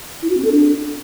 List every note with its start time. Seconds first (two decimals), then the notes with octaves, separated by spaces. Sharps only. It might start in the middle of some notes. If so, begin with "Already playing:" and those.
0.22 E4
0.30 F#4
0.37 C4
0.45 A4
0.52 D4